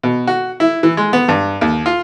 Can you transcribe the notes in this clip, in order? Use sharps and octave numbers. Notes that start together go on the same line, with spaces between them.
B2
F#4
E4
E3
G#3
B3
G2
D#2
F4